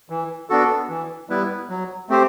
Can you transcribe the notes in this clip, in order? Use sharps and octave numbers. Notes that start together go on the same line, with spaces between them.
E3
B3 D4 F#4 A4
E3
G3 B3 E4 B4
F#3
A3 C4 G4 C5